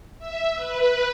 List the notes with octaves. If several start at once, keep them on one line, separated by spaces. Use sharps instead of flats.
E5
B4